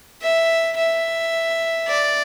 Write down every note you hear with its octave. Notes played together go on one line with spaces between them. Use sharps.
E5
E5
D5